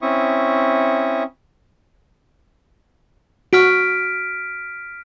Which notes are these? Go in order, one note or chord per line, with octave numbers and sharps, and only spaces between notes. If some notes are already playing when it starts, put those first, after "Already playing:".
C4 C#4 E4 E5 C#6 D#6
F#4 F6 B6 D7